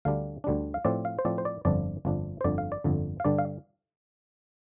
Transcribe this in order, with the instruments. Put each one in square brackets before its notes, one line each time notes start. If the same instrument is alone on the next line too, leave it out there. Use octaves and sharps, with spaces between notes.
[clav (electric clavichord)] D2 D3 G3 D4 F5
D2 D3 G3 D4
F5
A2 F3 C4 D5
F5
C5
A2 F3 C4 D5
C5
D5
G1 F2 F3 D4 D5
G1 F2 F3 D4
C5
G1 F2 D3 D5
F5
D5
G1 F2 D3
F5
G2 D3 G3 D4 D5
F5